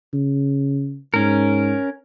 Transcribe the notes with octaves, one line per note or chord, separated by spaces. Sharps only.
C#3
G#2 C#4 A#4